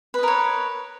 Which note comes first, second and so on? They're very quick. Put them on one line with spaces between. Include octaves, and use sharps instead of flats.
B4 D#5 A#4 C#5